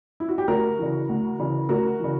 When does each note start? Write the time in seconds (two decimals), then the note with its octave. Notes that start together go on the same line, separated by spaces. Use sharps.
0.20 E4
0.29 F#4
0.38 G4
0.48 D2 F#4 A#4
0.79 C#3 E3
1.09 D2
1.39 C#3 E3
1.69 D2 F#4 A#4
2.00 C#3 E3